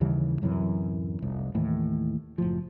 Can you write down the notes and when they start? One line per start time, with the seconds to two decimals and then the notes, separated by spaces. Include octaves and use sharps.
0.01 D#2 C#3 E3 G3
0.42 D1 F#2 C3 E3
1.22 F1 C2
1.55 D#2 A2 E3
2.38 F#1 A2 F3